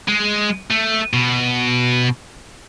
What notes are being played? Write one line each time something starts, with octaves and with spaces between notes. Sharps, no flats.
G#3
A3
B2